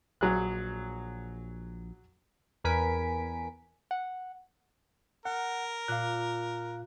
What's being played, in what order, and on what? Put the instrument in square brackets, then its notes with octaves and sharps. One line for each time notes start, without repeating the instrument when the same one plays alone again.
[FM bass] A#1 [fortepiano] F#3 G#4 F#6
[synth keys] E2 A#4 B4 G#5 B6 D7
F#5
[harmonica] A#4 [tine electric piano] F#5
[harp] A#2 [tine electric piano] F5 F#6